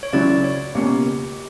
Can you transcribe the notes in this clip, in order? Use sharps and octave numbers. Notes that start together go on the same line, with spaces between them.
C#5
C#2 C#3 F#3 C#4 E4 D5
C#5
C#2 B2 A#3 C#4 G4